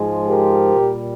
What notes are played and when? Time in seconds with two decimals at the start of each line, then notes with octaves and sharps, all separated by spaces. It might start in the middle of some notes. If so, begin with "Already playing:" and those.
Already playing: G#2 F3 G#3
0.28 G4 A#4
0.74 A#2 G3